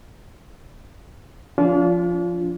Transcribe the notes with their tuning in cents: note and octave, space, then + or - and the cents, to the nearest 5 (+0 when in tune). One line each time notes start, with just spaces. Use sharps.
F3 +0 D4 -40 F4 -5